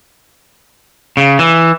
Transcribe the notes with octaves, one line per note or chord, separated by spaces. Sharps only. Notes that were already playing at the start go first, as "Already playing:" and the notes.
C#3
E3